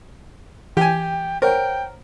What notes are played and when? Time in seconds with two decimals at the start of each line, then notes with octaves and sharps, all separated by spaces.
0.77 E3 G4 G5 G#5
1.42 A#4 C5 C#5 F#5 G5